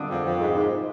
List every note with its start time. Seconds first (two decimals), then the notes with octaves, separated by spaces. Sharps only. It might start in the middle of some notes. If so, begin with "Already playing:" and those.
Already playing: D3 D6 D#6
0.09 F2
0.25 F2
0.40 G#2
0.56 G#2